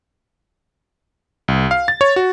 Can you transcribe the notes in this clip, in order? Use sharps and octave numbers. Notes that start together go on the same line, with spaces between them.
C2
F5
A6
C#5
F#4